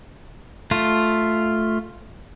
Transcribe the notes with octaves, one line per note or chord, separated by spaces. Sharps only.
A3 F4